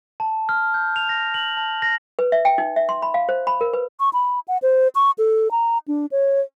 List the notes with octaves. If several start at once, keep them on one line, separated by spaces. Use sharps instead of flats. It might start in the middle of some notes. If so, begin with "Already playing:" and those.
A5
F6
G6
F7
A#6
F#7
A5
A#6
B4
E5
G5
D#4
E5
C6
B5
F5
C5
B5
A#4
B4
C#6
B5
F#5
C5
C#6
A4
A#5
D4
C#5